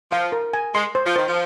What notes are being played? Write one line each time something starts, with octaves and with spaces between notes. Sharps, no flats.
F3 F5
A#4
G#5
G#3 C6
C5
F3
D#3 C5
F3